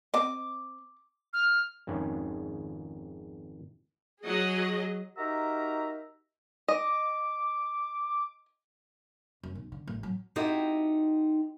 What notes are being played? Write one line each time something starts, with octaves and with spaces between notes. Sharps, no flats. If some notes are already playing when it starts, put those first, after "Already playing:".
C4 D#5 D6
F6
G#1 F2 G#2 C#4
F#3 G#4 D#5
D#4 F#4 G4 A#4 E5 A#5
D#5 D6
F#2
B1
D3
A1
F#3
C4 D#4 E4 F#4 G4 A4